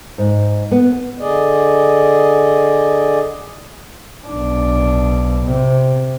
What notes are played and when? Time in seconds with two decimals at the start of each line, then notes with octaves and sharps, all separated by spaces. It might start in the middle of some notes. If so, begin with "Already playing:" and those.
0.18 G#2
0.71 B3
1.19 D3 G#4 D5 D#5
4.28 B1 D4
5.45 C3